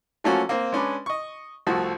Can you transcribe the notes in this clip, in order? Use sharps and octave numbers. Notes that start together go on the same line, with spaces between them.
F3 F#3 A3 A#3 C#4 F#4
A#3 C4
G#3 C#4 D4 B4
D#5 C#6
C2 F3 A3 F#4